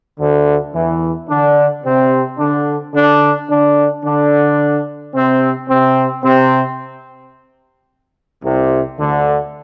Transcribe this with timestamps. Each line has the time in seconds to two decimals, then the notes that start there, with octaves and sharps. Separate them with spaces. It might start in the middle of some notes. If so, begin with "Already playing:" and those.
0.20 D2 D3
0.74 E2 E3
1.29 D3 D4
1.84 C3 C4
2.39 D3 D4
2.94 D3 D4
3.49 D3 D4
4.04 D3 D4
5.14 C3 C4
5.69 C3 C4
6.24 C3 C4
8.44 C2 C3
8.99 D2 D3